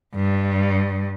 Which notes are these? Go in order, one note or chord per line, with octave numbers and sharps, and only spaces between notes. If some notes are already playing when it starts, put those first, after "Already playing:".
G2